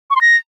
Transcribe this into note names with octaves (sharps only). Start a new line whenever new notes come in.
C#6
C6
A#6